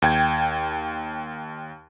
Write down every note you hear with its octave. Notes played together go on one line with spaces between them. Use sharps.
D#2 G5 G#6